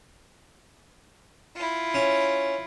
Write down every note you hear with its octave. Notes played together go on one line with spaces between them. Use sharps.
E4 F4
C#4